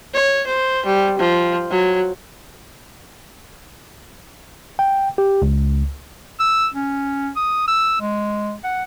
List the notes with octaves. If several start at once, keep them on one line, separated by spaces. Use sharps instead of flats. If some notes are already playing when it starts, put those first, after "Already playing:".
C#5
C5
G3
F3
F#3
G5
G4
C#2
E6
C#4
D#6
E6
G#3
F#5